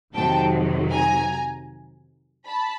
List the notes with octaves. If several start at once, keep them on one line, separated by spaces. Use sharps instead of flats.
F2 C3 D#3 F#3 G5 A5
G#5 A#5
A5 B5